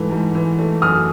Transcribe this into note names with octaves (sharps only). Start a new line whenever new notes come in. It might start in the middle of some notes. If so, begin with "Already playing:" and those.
Already playing: G#2 E3 A3
G#2
E3
A3
F#2 D#6 F6